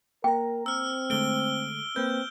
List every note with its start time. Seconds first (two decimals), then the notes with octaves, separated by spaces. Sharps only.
0.24 A#3 A#4 G5 A#5
0.66 C4 E6 F6
1.10 D3 G#3 A3 D7 G7
1.96 A#3 C4 B4 G6